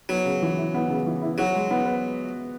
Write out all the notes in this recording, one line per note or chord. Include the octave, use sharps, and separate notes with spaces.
F#3 B3
C#3
E3
E4
B3
C#3
E3
E4
F#3 F#4
G#3
B3
B4